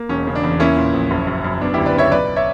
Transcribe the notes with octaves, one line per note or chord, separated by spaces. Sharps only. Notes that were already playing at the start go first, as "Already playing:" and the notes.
Already playing: A#3
E1 C#4
C#3
D4
E2
A#3 C#4 E4
A#2
A#1
F#1
F#2
F#2
B3 D4
D2 E4 G4
B4 D5
C#3 C#5 E5
B1 B4 D5
C#5 E5